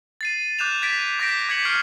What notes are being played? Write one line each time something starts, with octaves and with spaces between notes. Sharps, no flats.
A6 C7 D#7
D6 F#6 G6 E7 F7
G#6 A6 B6 D7 D#7
D6 G6 A#6 B6 D7
D6 G#6 B6 C#7 F#7
C#6 F6 G#6 C7 D7